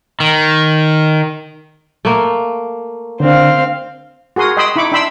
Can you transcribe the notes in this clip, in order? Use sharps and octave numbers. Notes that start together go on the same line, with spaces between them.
D#3
A3 A#3
D3 C4 D4 F5
F#4 G#4 A#4 C6 D#6
D#5 G5 B5 C6 D#6 E6
D#4 E4 B5 C#6 D6
D4 E5 G5 B5 C6 E6